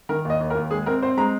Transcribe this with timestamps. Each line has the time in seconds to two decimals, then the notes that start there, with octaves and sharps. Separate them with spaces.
0.09 D#3 A#4
0.25 D#2 D#5
0.40 D#2
0.50 A#4
0.55 D#2
0.71 G#3 G#4
0.86 C4 A#4
1.02 C4 C5
1.18 G#3 A#5